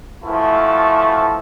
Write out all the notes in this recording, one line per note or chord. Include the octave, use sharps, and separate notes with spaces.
E3 F3 A3 E4 F#4 A4